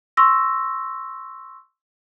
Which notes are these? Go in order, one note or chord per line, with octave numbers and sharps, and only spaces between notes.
C6 C#6 E6 A#6